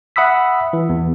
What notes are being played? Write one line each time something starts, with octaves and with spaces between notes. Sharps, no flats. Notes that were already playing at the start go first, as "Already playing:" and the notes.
E5 F#5 B5 D#6 E6 B6
E3
E2